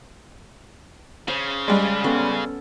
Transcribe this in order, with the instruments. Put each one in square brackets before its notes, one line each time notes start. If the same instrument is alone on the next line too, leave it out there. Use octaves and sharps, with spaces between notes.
[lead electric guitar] C#3 [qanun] C5
[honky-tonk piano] G3 G#3
[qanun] B3 C#4 A4